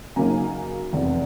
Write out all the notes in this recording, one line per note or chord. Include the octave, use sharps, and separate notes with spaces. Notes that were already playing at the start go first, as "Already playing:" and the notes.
F#2 C#3 F#3 A#3 D#4 G#5 A#5
F1 E2 C3